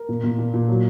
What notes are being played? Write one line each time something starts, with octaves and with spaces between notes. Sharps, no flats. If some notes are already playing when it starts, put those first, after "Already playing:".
Already playing: A#4
A#2
A#2
A#2
A#2
F#3